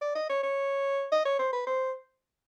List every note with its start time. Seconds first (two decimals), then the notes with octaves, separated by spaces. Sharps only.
0.01 D5
0.15 D#5
0.29 C#5
0.43 C#5
1.12 D#5
1.25 C#5
1.39 C5
1.53 B4
1.67 C5